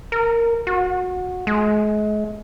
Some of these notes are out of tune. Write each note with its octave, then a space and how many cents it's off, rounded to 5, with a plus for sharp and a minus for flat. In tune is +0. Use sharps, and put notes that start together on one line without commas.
A#4 -5
F#4 -20
G#3 +35